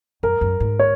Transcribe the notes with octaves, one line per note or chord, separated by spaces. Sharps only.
F#2 A#4
F#2
G#2
C#5